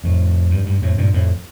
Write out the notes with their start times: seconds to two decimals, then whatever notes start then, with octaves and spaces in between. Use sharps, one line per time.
0.04 F2 A2
0.50 G2
0.66 G2
0.82 F2 A2
0.98 G2 A#2
1.13 F2 A2